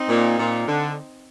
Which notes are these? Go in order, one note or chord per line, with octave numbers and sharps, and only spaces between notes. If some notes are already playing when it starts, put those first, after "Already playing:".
Already playing: C4 D#4
A#2
A#2
D3